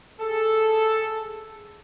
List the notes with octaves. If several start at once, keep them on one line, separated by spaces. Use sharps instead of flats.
G#4 A4